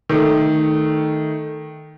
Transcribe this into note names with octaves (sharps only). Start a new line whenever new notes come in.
D#3 A3